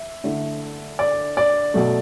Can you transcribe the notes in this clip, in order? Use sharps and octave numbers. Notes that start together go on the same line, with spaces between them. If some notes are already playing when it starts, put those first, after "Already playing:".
Already playing: E5
D3 A3 E4
D5
D5
B2 F#3 A3